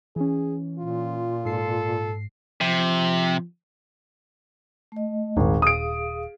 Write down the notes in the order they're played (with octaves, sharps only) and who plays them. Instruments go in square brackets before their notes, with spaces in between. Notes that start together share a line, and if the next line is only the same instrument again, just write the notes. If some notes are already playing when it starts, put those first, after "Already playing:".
[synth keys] E3 C#4 [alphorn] G#4
[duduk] A#2 [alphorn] F4
[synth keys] G#2 C7 [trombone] A4
[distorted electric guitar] C3 [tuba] F3
[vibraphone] A3 D#5
[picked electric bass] D#1 [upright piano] G#1 [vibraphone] G#4 F5
[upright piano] D#6 D7